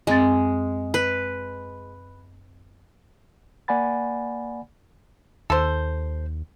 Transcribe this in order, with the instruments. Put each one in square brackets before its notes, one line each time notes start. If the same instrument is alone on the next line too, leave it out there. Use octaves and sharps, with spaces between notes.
[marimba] F#2 C4 A6 [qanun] G#3
[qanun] B4
[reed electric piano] A#3 D5 F#5 G#5 B5 A6
[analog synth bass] D#2 [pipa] A4 C5